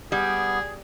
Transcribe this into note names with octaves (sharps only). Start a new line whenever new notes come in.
G3 B3 G#4